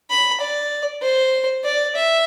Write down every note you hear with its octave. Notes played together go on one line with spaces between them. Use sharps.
B5
D5
C5
D5
E5